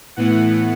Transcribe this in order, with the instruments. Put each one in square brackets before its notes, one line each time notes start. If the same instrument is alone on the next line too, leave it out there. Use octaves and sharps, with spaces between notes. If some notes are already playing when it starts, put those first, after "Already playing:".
[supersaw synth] A2 E3 B3 F#5